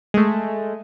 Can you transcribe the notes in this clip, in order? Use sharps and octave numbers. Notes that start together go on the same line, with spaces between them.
G#3 A3